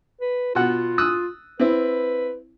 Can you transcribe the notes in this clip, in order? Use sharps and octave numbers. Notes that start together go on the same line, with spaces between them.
B4
B2 F4 F#5
D#6 E6 F#6
C4 E4 B4